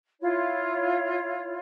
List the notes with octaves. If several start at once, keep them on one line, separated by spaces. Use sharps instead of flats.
E4 F4 C#5